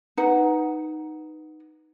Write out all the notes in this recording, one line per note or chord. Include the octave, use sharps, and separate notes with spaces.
D#4 B4 F#5